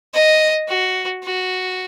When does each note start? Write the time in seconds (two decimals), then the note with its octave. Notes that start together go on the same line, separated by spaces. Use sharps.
0.14 D#5
0.68 F#4
1.24 F#4